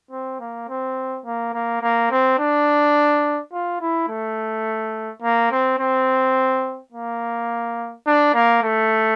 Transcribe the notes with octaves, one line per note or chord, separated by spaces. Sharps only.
C4
A#3
C4
A#3
A#3
A#3
C4
D4
F4
E4
A3
A#3
C4
C4
A#3
D4
A#3
A3